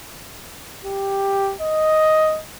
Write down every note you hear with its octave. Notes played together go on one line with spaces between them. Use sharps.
G4
D#5